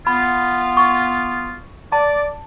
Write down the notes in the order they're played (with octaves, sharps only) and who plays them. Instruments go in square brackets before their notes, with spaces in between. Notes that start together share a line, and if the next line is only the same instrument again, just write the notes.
[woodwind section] B3 F4 [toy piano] B5
[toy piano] C#6
[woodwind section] D5 [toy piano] A5